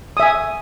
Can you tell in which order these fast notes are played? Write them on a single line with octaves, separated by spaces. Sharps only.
D#6 E5 G#5